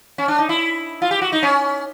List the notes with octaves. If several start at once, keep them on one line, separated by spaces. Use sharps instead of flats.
C#4
D4
D#4
E4
F4
G4
F#4
D#4
C#4